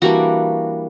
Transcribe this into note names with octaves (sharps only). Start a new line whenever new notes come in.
E3 G3 A#3 D4 F#4